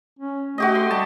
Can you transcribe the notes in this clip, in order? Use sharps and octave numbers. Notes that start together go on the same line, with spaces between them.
C#4
A3 F#4 G4 D#5
C6
G3 A5